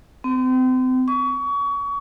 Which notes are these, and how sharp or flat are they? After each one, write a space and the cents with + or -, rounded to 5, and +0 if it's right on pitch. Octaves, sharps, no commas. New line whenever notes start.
C4 -35
C#6 +30